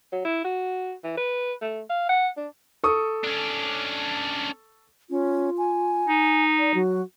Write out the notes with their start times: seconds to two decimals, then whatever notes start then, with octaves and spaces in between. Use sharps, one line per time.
0.12 F#3
0.25 E4
0.44 F#4
1.04 E3
1.17 B4
1.62 A3
1.89 F5
2.09 F#5
2.37 D4
2.84 A4 C#6 D#6
3.24 C#4 D4
5.10 C#4 F4
5.58 G#5
6.09 D#4
6.59 D5
6.74 F#3 F#4